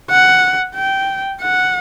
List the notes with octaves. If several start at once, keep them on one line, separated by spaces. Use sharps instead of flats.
F#5
G5
F#5